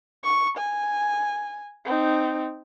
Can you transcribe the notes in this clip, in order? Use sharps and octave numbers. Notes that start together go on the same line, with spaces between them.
C#6
G#5
C4 D#4